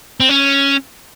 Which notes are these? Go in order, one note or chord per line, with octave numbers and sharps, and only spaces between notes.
C4
C#4